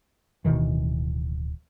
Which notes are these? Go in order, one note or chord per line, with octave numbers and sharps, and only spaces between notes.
D1 B2 D#3 E3